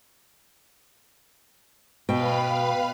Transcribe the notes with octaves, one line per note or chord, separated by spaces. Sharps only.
B2 B4 F5 G5 B5